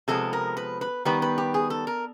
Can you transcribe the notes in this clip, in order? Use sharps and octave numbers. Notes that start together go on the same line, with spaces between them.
C3 F3 G#3 B3 A4
A#4
B4
B4
D#3 G3 B3 B4
B4
G4
G#4
A4
A#4